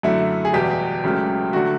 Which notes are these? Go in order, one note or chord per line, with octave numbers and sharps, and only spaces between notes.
F#2 D3 F#3 A3 E4
G#4
E2 B2 G3 G4
C#2 C#3 F#3 A3
D3 F#3 A3 F#4